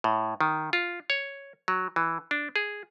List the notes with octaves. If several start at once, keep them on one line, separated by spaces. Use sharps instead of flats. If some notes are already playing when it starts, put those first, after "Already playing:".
A2
D#3
F4
C#5
F#3
E3
D4
G#4